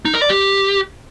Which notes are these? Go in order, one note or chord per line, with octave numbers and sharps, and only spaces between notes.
D#4
A#4
D5
G4